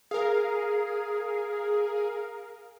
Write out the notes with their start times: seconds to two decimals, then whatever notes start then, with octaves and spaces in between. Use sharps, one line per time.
0.11 G#4 A#4 F5